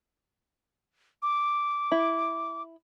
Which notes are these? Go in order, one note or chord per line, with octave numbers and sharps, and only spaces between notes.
D6
E4